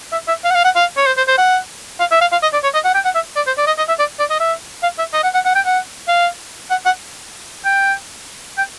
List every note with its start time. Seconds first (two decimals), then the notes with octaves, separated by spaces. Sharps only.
0.12 E5
0.28 E5
0.44 F5
0.51 F#5
0.55 F5
0.65 F#5
0.75 F5
0.97 C#5
1.07 C5
1.17 C5
1.28 C5
1.38 F#5
2.00 F5
2.11 E5
2.21 F5
2.32 F5
2.43 D#5
2.53 D5
2.63 C#5
2.74 D#5
2.85 F#5
2.94 G5
3.05 F#5
3.15 E5
3.36 D5
3.47 C5
3.58 D5
3.67 D#5
3.78 D#5
3.88 E5
3.99 D5
4.20 D5
4.30 D#5
4.40 E5
4.83 F5
4.99 E5
5.13 D#5
5.24 F#5
5.34 F#5
5.45 F#5
5.55 G5
5.66 F#5
6.08 F5
6.70 F#5
6.86 F#5
7.65 G5
8.58 G5